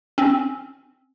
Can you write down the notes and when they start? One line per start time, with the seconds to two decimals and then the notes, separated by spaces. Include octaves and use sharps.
0.18 C4 C#4